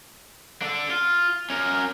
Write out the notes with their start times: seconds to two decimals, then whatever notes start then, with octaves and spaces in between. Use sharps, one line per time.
0.62 D4 A4
0.90 F4
1.50 C#4 A#4